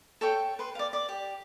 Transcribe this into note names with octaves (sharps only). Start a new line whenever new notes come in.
A4 C#5 G5
B4 C6
D5 F5
D5
G4